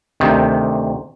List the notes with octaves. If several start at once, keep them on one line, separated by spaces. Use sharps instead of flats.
D2 C3 D#3